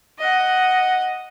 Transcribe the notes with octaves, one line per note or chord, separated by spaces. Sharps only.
D#5 F#5